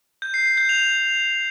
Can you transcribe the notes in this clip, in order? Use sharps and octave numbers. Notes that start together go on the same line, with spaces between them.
G6
C7
C7
G6
F7